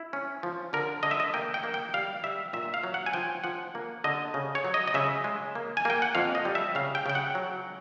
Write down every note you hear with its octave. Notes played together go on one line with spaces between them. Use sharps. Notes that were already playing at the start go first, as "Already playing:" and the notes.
Already playing: E4
C#4
F3
D3 A#4
D3 D#5
E5
D#5
A#3 G5
G5
A#3
G5
G3 F5
G3 E5
A#2 E5
F5
F#3
F#5
G#5
F3 G5
F3 F#5
A#3
D3 D#5
C#3
C#5
F#3
D#5
D#5
C#3 E5
G#3
A#3
G#5
A#3 G5
F#5
F2 F5
D#5
G3
E5
C#3 F5
G5
C#3 G5
F#5
F#3